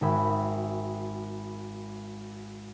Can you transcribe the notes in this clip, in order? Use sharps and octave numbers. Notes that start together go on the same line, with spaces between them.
G#1 F#4 G#4 E5 G5 B5